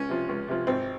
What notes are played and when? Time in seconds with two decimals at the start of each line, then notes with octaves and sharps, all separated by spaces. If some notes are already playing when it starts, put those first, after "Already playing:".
Already playing: C#2 C#4
0.09 C3 F3
0.29 C#2
0.48 C3 F3
0.67 G#1 C4